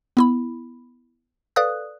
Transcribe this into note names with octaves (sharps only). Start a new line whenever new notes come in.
B3 E4 B5
A4 B4 D5 F5 D#6 F#6